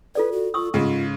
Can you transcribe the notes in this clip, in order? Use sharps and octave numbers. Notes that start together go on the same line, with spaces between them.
F4 A4 B4 D5
F#4
F4 C#6 D#6 E6
G#2 C#3 F4